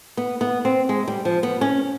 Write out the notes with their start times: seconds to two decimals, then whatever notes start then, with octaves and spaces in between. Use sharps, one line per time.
0.17 B3
0.41 B3
0.65 C4
0.89 G#3
1.08 G3
1.25 F3
1.43 B3
1.61 C#4